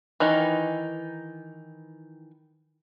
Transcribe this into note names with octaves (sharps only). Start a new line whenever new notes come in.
D#3 E3 D#4